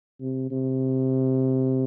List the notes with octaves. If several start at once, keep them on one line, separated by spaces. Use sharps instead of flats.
C3
C3